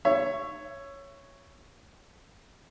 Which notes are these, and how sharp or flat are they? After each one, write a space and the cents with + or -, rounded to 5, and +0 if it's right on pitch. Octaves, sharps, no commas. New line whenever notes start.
C#5 +0 E5 +25